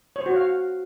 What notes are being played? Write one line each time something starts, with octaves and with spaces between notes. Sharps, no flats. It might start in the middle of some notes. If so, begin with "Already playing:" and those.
C#5
C5
F#4
C#5
F5